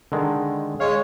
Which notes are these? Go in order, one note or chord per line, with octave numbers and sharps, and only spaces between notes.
D3 D#3 G#3
G#3 C#5 F5